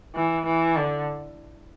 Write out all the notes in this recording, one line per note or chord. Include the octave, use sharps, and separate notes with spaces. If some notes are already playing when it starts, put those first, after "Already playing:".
E3
E3
D3